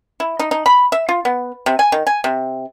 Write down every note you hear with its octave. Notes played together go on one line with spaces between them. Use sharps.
E4
D#4
D#4
B5
E5
F4
B3
C3
G#5
D#3
G#5
C3